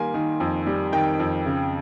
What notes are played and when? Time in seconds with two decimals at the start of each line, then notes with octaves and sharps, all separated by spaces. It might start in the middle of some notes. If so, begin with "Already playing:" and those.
Already playing: D#3 G3 A#3 G#5 C6
0.14 D#3
0.40 F2
0.67 G3
0.92 D#3 G5
1.19 F2
1.46 C#3